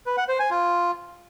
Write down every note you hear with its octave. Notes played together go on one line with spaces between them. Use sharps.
B4
F#5
C5
G#5
F4